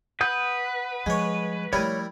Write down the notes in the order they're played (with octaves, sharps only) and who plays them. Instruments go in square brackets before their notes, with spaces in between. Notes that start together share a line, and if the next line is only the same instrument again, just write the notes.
[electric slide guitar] B4 [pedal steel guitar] F#5 D#6 G6
[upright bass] F3 G3 [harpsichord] G#3 C#5
[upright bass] F3 A3 [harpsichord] G3 E4 A#4 [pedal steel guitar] C#5